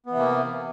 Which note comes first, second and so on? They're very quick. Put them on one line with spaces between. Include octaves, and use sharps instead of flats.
B3 E3 C3 A#3